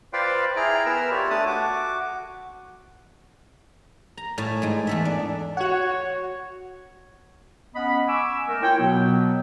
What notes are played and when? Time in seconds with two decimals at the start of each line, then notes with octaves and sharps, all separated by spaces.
0.13 F4 B4 C5 D5 F5 G5
0.56 E4 G#4 G5 A#5 F6
0.86 B3 A#4 B4 E6 F6
1.11 F4 G4 C#5 D5
1.30 A3 D4 A5 D#6
1.46 F#4 D6
4.17 A#5
4.38 A2 G#5 A5
4.62 G#2 G#3
4.87 E2 A4 E5
5.05 D4
5.57 F#4 C#5 F#5
7.75 B3 C#4 D#5 F#5 B5
8.07 G#5 C#6 D6 E6
8.49 A3 A#4
8.62 E4 F4 C#5 G5
8.79 B2 F#3 B3